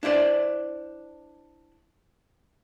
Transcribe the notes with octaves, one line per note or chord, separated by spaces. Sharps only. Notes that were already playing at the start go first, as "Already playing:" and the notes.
D4 E4 C5 D5